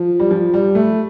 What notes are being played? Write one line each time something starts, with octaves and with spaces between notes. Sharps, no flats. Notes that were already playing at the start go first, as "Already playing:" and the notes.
Already playing: F3
G3
F3
G3
A3